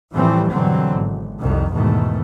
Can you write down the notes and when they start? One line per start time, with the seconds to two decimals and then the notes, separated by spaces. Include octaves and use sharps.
0.13 A2 E3 F3 G3 A3 C4
0.51 G2 B2 D3 E3 F#3 C4
0.96 G#1
1.40 C2 F2 C3 D#3
1.73 E2 G#2 B2 D#3 A3